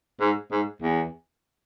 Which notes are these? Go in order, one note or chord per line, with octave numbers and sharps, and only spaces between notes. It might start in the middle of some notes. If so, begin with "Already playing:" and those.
G#2
G#2
E2